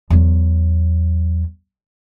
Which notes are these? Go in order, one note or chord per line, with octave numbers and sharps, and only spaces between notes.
E2 F#3